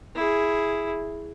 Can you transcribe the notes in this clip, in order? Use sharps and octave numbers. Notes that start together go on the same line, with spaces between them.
E4 G#4